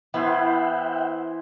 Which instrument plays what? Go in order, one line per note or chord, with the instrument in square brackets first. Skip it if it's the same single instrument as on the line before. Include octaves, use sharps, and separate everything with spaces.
[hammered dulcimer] E3 E4 C5 [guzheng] B3 [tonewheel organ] E5 F#5 G5